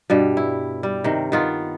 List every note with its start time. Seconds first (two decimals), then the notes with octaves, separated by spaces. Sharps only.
0.10 G2 B2 G3
0.37 E4
0.83 G3
1.04 C3 D#3
1.32 D#3 B3 F4